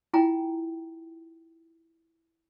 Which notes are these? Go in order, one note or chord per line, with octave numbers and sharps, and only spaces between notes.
E4 F4 G5 G#5 A#5